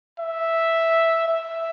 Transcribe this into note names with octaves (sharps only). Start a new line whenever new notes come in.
E5
E5